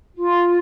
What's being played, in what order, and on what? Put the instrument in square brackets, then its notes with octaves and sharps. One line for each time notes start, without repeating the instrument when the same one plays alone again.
[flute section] F4